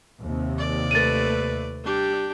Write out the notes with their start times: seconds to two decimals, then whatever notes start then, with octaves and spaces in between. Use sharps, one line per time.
0.22 D#2 C3
0.59 D5
0.91 A3 B4 A6 D#7
1.84 G3 D4 G4